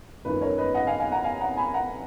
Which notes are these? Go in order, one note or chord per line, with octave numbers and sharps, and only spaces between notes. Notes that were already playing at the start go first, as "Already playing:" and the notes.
F#2 D#3 A#3 C#4 F4 B4
A#4 C#5
B4 D#5
D#5 F#5
F5 G#5
F5 G#5
F#5 A#5
F5 G#5
F#5 A#5
G#5 B5
F#5 A#5